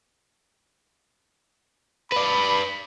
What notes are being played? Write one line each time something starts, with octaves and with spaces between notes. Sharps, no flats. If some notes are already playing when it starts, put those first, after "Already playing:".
B4 D5 B5